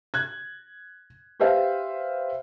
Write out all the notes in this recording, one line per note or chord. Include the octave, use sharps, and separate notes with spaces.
F#6 G#6
G4 B4 C5 E5 F5